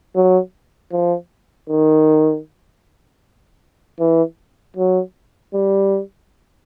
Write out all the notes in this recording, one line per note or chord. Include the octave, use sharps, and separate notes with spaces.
F#3
F3
D#3
E3
F#3
G3